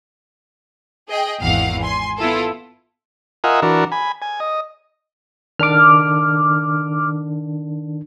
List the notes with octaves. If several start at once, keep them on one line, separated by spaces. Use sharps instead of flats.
G#4 D#5 G5
G#1 E2 E3 F5 F#5
G#5 C6
B3 E4 F4 A4
F4 A#4 D#5 E5 F#5 G#5
E3 D4 F#4 A#4
G#5 B5
G#5
D#5
D#3 D4 D6 F6